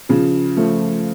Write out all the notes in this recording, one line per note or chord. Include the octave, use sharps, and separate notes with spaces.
C#3 F3
F3 A3